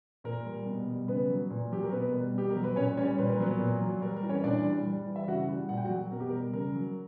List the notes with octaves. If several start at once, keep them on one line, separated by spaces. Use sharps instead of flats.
A#2 A#4
G3
B2
G3
C#3 B3 B4
F#3
A#2
F#3 G4
A#4
B2 B3 B4
G3
B2 G4
A#4
F#3
B4
A#2 C#4 C#5
G3 C#4 C#5
A#2 B4
A#4
F#3 B3 B4
A#2
F#3
G3 A#4
A#4
E3
C#4 C#5
A#2 D4 D5
G3
G3
E3
E5
C#3 F#4 F#5
G3
A#2 F#5
G5
F#4 F#5
F#3
B2 A#4
G4
A#4
G3
C#3 A#4
F#3